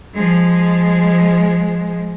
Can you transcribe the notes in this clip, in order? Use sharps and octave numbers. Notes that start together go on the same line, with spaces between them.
F3 G#3